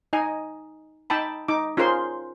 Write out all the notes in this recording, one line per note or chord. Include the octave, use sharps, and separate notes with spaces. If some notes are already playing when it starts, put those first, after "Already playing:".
D#4 D#5 G#5
D#4 G5 A5 B5
D#4 D6
C#4 F4 G#4 A#4 C5 C6